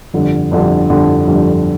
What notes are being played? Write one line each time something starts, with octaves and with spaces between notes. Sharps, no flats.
G1 F2 D3 G3
G1 F2 D3 G3
G1 F2 D3 G3
G1 F2 D3 G3